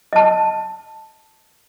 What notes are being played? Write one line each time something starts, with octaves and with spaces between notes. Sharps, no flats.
D#5 A5